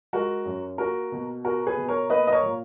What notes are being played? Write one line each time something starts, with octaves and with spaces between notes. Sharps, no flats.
G#3 F#4 A#4
F#2
A#3 F#4 A#4
B2
B3 F#4 A#4
G#4 B4
B2
A#4 C#5
A#3 B4 D#5
D#5
A#4 C#5
A#2